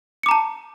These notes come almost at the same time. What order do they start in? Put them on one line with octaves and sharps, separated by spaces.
C#7 D6 A#5 A5